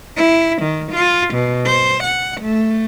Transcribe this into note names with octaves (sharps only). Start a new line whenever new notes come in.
E4
D#3
F4
B2
C5
F#5
A3